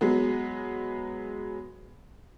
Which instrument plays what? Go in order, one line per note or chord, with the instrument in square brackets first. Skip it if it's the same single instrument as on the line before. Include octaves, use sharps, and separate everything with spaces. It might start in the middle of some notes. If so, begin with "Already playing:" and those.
[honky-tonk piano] F#3 G#3 B3